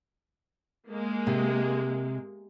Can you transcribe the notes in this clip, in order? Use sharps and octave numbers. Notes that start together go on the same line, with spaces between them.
G#3 A#3
C3